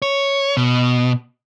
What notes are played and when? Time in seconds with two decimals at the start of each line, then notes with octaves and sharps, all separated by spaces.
0.02 C#5
0.57 B2